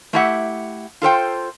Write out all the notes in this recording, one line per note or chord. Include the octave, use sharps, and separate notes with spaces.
A3 D4 E4 G4 E5 F#5
F4 A4 C5 G5